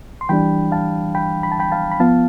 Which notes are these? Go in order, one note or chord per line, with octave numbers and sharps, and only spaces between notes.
C6
E3 G3 D4 G5 B5
F5 A5
G5 B5
B5
A5
G5 B5
F5 A5
B5
F3 B3 F4 F5 A5